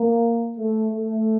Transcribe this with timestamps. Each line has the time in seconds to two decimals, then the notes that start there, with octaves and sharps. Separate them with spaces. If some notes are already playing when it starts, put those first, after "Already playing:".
Already playing: A#3
0.57 A3
0.92 A3